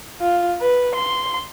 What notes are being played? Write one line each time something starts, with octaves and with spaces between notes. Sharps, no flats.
F4
B4
C6